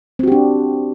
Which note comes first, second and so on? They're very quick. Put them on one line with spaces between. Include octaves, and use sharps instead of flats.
C4 F#4 G4 D4